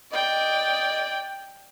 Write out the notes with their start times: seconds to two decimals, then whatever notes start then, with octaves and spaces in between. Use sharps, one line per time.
0.12 D5 D#5 G5